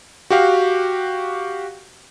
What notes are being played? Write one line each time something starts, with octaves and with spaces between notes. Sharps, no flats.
F#4 G4 F5